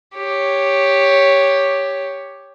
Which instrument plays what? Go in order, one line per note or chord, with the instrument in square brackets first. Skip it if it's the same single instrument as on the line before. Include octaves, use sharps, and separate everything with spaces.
[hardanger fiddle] G4 C#5